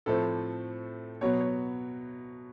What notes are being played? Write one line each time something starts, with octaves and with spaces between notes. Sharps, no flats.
A2 F3 A3 C4 A4
B2 F#3 B3 C#5
C#5